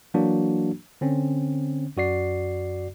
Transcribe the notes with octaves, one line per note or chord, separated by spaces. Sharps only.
E3 F#3 A#3 D4 F#4
D3 C4 C#4
F#2 F#4 D5 C7